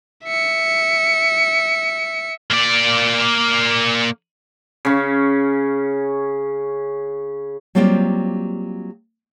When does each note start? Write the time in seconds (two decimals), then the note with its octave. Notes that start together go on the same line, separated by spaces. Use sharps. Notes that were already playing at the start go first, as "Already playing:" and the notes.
0.24 E5 C#7
2.50 A#3 D5
4.85 C#3 C#4
7.75 F#3 G3 A#3 C4 F4 G4